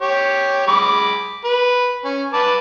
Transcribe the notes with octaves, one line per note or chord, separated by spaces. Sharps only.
G4 C#5
G#3 B5 D6
B4
C#4
B4 A5 D6